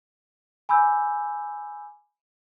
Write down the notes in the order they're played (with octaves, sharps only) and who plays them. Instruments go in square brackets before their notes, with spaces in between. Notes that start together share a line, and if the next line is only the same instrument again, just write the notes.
[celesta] G#5 B5 D6 E6 G6